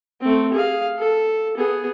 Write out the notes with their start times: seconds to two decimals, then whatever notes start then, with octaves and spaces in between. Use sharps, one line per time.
0.21 A3 C4
0.53 G#4 F5
0.98 A4
1.57 B3 G#4